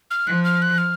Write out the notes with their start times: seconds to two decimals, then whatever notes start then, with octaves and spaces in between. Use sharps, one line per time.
0.11 F6
0.27 F3 F#6
0.44 F6
0.62 F#6
0.78 F6